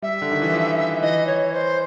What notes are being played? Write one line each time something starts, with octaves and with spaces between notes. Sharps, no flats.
G3 E5
D3
D#3
E3
F3
E3 D#5
C#5
C5